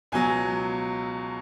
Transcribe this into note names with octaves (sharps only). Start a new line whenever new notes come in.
C#2 B2 F#3 G#5